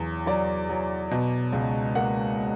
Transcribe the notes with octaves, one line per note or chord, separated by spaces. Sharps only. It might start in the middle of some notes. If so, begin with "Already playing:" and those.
Already playing: E2 F#3
F#3 D5
F#3
B2
C#2
A#3 F#5